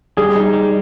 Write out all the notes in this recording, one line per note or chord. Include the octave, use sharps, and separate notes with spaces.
G3 G#4
D#4
G3